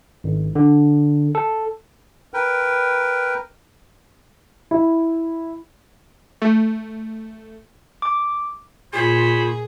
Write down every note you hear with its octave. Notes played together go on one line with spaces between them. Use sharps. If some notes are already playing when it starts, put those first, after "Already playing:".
G#1
D3
A4
A#4 B4 G5
E4
A3
D6
A#2 F4 G#4 C5 C#5 B5